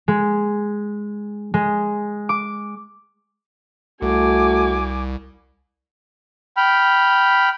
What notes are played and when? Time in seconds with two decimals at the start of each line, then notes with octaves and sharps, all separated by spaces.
0.08 G#3
1.54 G#3
2.29 D6
4.02 C2 A3 F#4 G#5 D6
6.57 G5 B5 F6